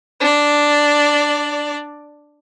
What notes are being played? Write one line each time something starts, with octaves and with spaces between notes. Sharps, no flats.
D4 D5